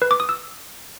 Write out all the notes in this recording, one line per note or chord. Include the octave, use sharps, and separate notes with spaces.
B4
D6
D#6
E6